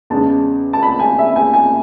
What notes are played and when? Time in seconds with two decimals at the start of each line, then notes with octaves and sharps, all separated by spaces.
0.10 E2 C#3 G#3 A5
0.73 A5
0.83 B5
0.99 G#5
1.19 E5
1.36 G#5
1.53 G#5